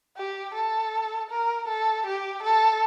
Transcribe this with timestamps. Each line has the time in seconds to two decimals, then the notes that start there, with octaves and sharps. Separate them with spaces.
0.17 G4
0.55 A4
1.30 A#4
1.69 A4
2.07 G4
2.43 A4